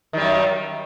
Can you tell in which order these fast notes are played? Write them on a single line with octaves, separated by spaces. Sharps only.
D#3 G3 F#2